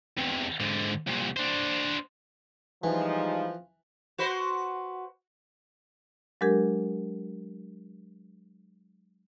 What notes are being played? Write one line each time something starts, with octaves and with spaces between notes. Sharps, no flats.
E2 C3
G#2 D3
C2 A#2
D4 C5
E3 F3 G3 G#3 D#4
F#4 B4 C5
F#3 G#3 D4 G4 A#4 G#6